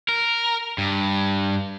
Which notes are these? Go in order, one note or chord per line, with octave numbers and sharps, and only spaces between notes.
A#4
G2